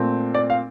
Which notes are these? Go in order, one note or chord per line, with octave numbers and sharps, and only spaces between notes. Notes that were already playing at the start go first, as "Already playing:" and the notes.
Already playing: A#2 A3 C4
D5
F5